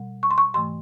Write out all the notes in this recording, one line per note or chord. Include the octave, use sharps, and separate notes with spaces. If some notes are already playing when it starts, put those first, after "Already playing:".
Already playing: B2 G3
C#6
C6
C#6
G#2 E3 A3 C6